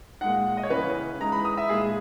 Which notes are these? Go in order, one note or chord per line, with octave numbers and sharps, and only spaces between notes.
A#2 G#3 D#4 F#5
D#5
C#5
C#3 E3 A#3 C#4 B4
E3 G#3 D#4 A#5
B5
D#6
E5
A#2 G#3 D#4 G#4